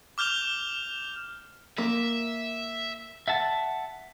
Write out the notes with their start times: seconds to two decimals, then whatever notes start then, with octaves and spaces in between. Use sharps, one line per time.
0.18 D6 F6 G6 F7 G7
1.78 A#3 E5
3.28 E5 F#5 A5